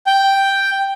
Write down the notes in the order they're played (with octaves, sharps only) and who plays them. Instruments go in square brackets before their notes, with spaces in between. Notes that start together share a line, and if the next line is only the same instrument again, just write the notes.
[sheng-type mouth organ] G5